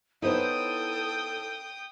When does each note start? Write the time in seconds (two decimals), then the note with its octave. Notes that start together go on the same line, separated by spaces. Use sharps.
0.22 B3 D#4 E4 A4 C5 C#5 G5 D#6